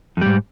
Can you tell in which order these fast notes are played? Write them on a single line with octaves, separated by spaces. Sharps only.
F2 G3 G#2